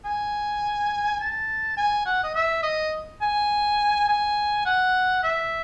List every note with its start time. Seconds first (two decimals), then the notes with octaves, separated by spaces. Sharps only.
0.05 G#5
1.20 A5
1.77 G#5
2.06 F#5
2.24 D#5
2.35 E5
2.63 D#5
3.21 G#5
4.08 G#5
4.66 F#5
5.23 E5